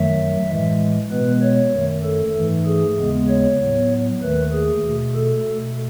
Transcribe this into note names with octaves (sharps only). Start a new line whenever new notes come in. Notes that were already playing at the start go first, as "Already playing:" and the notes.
Already playing: F#2 D#3 F#3 A3 E5
A2 E3 G#3
B2 G#3 B3 B4
C#5
F#2 D#3 A3
A4
G#2 E3 A3
G#4
D#2 C#3 G#3 B3
C#5
A2 F#3 B3
D#2 D#3 A3 B4
G#4
B2 A3
A4
B2 A3